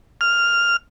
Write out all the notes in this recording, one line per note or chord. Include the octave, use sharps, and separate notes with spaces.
F6